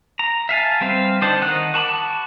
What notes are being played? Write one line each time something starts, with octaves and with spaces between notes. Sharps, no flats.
A#5
E5 F5 G#5 A5
G3 C4 B4 F5
D3 D4 D#4 C5 A5
D#3 D#4 F#5 F#6
F#4 A5 B5 D6